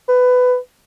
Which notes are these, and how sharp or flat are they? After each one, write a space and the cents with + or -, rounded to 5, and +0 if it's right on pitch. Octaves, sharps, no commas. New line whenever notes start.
B4 +15